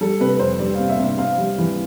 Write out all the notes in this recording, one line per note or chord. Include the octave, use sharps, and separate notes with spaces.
G3 A4
C3 B4
F2 C5
G3 D5
C3 F5
E5
C3
E5
C4 F5
G3
E3